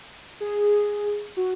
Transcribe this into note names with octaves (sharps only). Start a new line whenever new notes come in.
G#4
F#4